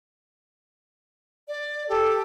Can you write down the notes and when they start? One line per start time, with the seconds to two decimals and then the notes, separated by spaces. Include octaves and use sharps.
1.48 D5
1.89 G4 A4